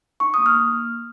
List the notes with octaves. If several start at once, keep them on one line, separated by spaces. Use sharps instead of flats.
D#4 C#6
A#3 D#6
F6
A#3